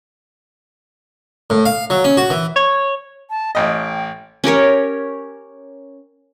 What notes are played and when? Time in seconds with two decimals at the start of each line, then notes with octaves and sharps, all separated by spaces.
1.50 A2
1.65 F5
1.90 F#3
2.04 C#4
2.17 F#4
2.30 E3
2.56 C#5
3.30 A5
3.55 A1 D#5 G5
4.44 C#4 G4 A#4 C#5